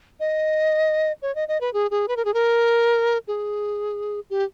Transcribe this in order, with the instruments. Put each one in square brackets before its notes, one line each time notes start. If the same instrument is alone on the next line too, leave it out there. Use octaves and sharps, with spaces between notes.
[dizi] D#5
C#5
D#5
D#5
B4
G#4
G#4
B4
A#4
G#4
A#4
G#4
G4